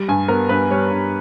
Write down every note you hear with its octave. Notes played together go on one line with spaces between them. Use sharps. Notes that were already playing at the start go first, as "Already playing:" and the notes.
Already playing: G3
G2 G#5
B3 A#4
G2 B4
G3 C#5
G2